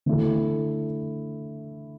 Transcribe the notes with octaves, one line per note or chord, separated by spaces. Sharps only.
D3 A3 E4 A4